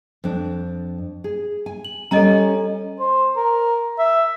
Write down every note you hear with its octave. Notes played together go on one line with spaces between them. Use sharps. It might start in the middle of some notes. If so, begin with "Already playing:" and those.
F2 D4
G#4
G#5
F#7
G3 C#4 A4 D#5 A#5
C5
A#4
E5